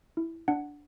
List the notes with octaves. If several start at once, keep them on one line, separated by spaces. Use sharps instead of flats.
E4
D4 F#5